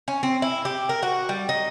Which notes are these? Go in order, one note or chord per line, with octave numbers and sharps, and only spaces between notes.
C#4
C4
E4
G4
A#4
F#4
G3
D#4